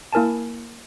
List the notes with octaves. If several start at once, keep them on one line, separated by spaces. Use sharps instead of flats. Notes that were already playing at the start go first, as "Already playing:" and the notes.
A#3 E4 A#4 G#5 A5